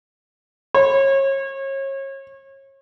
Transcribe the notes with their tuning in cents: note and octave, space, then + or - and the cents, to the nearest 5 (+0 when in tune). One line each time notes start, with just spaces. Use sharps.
C#5 -35